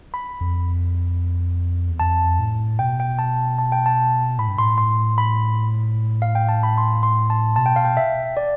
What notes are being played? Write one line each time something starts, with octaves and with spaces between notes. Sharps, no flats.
B5
F2
E2
F2 A5
A2
B2 G5
G5
A5
A5
G5
A5
A2 B5
G2
A2 C6
C6
B5
F5
G5
A5
B5
C6
C6
A5
B2 A5
G5
F5
G5
E5
D5